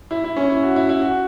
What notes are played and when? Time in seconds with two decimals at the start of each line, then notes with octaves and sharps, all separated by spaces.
0.11 E4
0.24 E4
0.37 C#4
0.50 E4
0.63 F#4
0.76 E4
0.89 E4
1.02 F#4